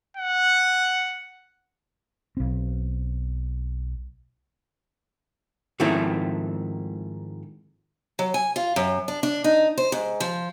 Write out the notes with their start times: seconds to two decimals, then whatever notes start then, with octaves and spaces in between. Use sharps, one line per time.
0.17 F#5
2.37 B1 C4
5.80 G#2 D#3 F3 A3 C4 E4
8.19 F#3
8.34 G#5
8.56 F4
8.76 F#2
9.08 D4
9.23 D4
9.44 D#4
9.78 C5
9.92 G#2
10.20 F3